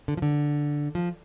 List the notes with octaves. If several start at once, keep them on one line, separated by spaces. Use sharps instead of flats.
D3
F3
D3
F3